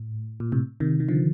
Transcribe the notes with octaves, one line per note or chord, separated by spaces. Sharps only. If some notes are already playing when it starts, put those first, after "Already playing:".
Already playing: A2
A#2
A2 C3
C3 D#3
D#3
D3 F3